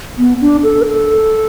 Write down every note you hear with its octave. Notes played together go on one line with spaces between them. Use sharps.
B3
D4
A4
B4
A4